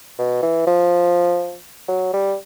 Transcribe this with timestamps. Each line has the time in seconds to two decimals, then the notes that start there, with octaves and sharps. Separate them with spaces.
0.18 B2
0.43 E3
0.67 F3
1.88 F#3
2.13 G3